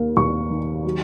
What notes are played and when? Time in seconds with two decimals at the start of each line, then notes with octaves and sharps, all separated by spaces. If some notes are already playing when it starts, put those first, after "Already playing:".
Already playing: D#2 A#3
0.17 D#2 C#6
0.50 D#3
0.85 F#3